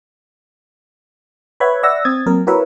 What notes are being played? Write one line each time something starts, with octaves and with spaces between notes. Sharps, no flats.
B4 C#5 E5 F#5 B5 G#6
D5 E5 F#5 E6 A#6
C4 D#6 G#6 A6
F#3 A#3 C4 A#4
E4 F#4 A#4 B4 C#5 E5